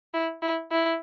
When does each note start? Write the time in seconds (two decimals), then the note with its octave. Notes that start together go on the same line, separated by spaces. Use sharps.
0.14 E4
0.42 E4
0.71 E4